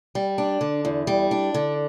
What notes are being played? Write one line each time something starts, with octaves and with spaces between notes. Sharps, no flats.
G3
D4
D3
E2
G3
D4
D3